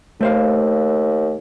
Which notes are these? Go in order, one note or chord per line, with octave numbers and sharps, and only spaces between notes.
D#2 A3 C5 F5